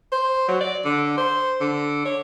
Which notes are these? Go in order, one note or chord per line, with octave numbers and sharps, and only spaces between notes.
C5
F#3
D5
D3
C5
D3
C#5